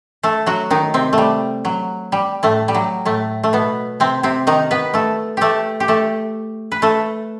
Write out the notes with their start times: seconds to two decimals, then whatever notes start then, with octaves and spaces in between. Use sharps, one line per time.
0.23 A3 A4
0.46 F#3 F#4
0.71 D#3 D#4
0.94 C3 C4
1.13 A3
1.18 G3
1.65 F#3
2.12 G3
2.43 A2 A3
2.68 G3
2.75 F#3
3.06 A2 A3
3.44 A3
3.53 B2 B3
4.00 C3 C4
4.23 C3 C4
4.47 D#3 D#4
4.71 B3 B4
4.94 A3 A4
5.37 A3 G4 A4
5.80 G4
5.88 A3 A4
6.72 B4
6.82 A3 A4